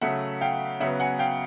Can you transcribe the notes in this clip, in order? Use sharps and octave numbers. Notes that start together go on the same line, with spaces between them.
C#3 F#3 A3 E5 F#5
F5 G5
C#3 F#3 B3 E5 F#5
F#5 G#5
F5 G5